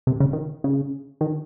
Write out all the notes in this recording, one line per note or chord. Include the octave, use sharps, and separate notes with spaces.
C3
C#3
D#3
C#3
D#3